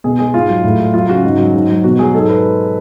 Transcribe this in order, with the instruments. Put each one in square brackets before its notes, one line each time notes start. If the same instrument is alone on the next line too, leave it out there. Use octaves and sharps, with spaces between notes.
[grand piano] B2 G#4
G#3 G#4
G#2 F4
F#3
A2
G#3
F#3 F4
C#3 F#4
G#2
F#3
G#2
F#3
B2 F#4
F#3 G#4
G#2 A4
G#3 B4